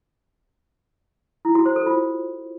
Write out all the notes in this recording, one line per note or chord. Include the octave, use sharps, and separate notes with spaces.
E4
F#4
C5
A4
F4